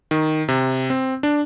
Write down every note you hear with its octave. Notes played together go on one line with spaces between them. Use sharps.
D#3
C3
C4
D4